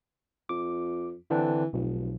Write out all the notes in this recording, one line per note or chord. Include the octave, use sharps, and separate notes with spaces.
F2 D6
D3 E3 C4 D4
F1 B1